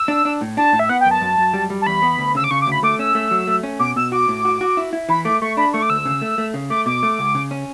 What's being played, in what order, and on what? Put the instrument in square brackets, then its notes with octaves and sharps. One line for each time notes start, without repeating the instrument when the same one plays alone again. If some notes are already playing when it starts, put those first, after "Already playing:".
Already playing: [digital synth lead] E6
[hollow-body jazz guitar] D4
D4
A2
[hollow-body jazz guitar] D4 [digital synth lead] A5
[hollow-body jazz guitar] A2
[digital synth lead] E5
[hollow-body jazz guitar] B3 [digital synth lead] F#5
[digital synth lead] G5
[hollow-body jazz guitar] F#2
[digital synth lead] A5
[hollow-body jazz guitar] F#2
F#2
G3
G3
[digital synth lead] A5
[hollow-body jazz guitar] E2 [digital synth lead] B5
[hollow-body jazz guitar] B3
D2
[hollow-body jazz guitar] C#3 [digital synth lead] E6
[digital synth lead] D6
[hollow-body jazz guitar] C#3 [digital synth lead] C#6
[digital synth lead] D6
[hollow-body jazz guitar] D2
[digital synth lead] B5
[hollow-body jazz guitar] A3 [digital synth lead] D6
[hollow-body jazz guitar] C#4 [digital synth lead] E6
[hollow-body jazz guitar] A3
F#3
A3
C#4
[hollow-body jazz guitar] B2 [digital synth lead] D6
[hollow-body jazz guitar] B2 [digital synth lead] E6
[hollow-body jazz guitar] F#4 [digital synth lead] D6
[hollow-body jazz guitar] A2
F#4
F#4
E4
E4
[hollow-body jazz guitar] E3 [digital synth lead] B5
[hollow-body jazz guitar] A3 [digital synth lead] D6
[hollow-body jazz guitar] A3 [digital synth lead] C#6
[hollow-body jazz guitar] D4 [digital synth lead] B5
[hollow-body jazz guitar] A3 [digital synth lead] C#6
[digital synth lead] D6
[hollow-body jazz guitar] D2 [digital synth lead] E6
[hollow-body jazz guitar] C#3
A3
A3
C#3
[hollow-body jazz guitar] A3 [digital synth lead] D6
[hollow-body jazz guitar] B2 [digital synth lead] D6
[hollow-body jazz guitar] A3
C#2
C#3
C#4